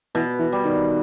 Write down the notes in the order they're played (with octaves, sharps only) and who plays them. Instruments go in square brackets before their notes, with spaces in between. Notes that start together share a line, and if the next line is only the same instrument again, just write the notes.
[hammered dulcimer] B2 [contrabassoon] E3
[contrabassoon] E3
[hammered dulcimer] G3
[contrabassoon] D#3